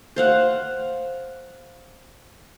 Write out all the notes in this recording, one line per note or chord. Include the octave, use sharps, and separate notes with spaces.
C5 F5 F#5